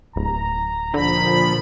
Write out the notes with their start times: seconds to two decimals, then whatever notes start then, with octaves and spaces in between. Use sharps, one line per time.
0.16 D1 A#5
0.94 A#2 D3 F3 B5